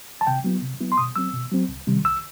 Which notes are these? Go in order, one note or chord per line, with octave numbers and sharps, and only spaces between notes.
A5
C3 G5
F#3 B3 E4
C3
F#3 B3 E4
C6
B2 D#6
F#3 C4 E6
B2
F#3 C4
C2
C3 D#3 G3
C2 E6